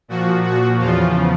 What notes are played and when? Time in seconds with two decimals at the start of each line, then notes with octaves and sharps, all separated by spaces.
0.08 A#2 F3 F#4
0.44 F#4
0.79 E2 C#3 F3 F4